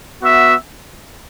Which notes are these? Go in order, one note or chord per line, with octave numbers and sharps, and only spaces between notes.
B3 F#4 E5